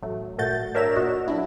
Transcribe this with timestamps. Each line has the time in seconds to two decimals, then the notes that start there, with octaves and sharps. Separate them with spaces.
0.02 A1 F#3 A3
0.38 G#1 A#2 A3 F#4 G6 A6
0.75 D4 A#4 C#5 E5 A#5 E7
0.96 A#2 F#4 D#5
1.28 F#3 D4 E4